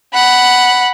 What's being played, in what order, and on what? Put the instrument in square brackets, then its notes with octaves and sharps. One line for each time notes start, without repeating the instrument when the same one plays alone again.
[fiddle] F#5 B5